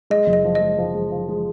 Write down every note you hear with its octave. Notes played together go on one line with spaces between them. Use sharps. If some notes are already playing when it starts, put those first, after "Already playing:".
G#3 D#5
F#1
D#5
F3
D#5
G#3
F3
G#3
F3
G#3